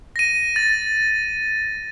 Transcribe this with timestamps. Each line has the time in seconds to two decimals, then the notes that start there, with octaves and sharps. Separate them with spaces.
0.16 A#6 D#7
0.56 A6